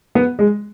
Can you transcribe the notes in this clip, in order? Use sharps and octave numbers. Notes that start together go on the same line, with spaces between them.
B3
G#3